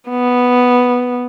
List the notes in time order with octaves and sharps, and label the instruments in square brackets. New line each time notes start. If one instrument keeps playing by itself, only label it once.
[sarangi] B3